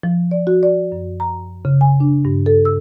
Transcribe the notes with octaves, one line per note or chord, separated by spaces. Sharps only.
F3
D5
F#4
D5
F#2
A#5
C#3
G#5
D4
G2
A4
E6